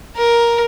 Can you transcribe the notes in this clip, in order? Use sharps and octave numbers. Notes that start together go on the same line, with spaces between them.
A#4